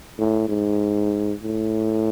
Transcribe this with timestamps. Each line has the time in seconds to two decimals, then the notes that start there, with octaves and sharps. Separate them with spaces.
0.18 A2
0.49 G#2
1.43 A2